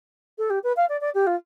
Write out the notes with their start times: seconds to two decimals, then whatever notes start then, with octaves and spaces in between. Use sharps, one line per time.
0.38 A4
0.50 G4
0.63 B4
0.76 F5
0.89 D5
1.01 D5
1.14 G4
1.26 F4